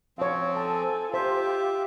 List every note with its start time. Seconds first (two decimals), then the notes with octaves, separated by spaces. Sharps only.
0.18 F3 C4 C#5 F5
0.57 A4 G#5 A5
1.14 F4 G4 C5 E5